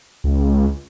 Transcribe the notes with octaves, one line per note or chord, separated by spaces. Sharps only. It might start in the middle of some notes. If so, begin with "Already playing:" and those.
C#2